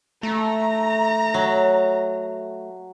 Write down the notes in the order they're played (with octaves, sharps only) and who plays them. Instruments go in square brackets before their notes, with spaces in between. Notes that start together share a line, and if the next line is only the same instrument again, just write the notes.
[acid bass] A3 [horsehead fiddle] A#5
[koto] F#3